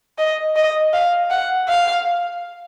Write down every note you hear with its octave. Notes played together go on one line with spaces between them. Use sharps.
D#5
D#5
F5
F#5
F5